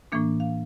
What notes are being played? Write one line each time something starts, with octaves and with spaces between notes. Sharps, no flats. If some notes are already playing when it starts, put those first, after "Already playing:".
A2 E3 A#3 D4
F5